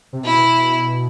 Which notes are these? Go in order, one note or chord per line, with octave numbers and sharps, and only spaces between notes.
C3
B2 E4